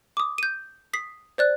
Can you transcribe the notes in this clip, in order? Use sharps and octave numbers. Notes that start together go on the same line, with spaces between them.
D6 D#6
G6 D#7
D#6 B6 C7
C5 D5 F#6